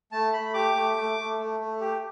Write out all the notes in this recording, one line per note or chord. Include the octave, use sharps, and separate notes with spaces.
A3 A5
A3 B5
G4 D6
A3
A3
A3
A3
A3
G4